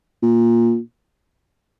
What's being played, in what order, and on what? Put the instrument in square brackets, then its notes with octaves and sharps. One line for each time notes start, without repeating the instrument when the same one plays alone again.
[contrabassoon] A#2